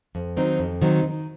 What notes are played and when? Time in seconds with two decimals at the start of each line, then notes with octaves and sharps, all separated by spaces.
0.15 F2
0.36 D#3 F#3 C4 D#4
0.59 F2
0.82 D#3 F#3 C4 D#4
1.03 D#3